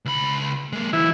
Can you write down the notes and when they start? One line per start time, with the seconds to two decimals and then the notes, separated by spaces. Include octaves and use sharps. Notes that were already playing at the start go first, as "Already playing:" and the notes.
0.05 C#2 B5
0.73 G#3 A#3
0.93 E3 F#3 E4